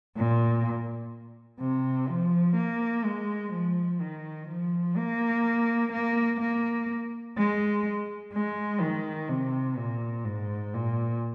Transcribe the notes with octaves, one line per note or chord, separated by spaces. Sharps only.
A#2
C3
F3
A#3
G#3
F3
D#3
F3
A#3
A#3
A#3
G#3
G#3
D#3
C3
A#2
G#2
A#2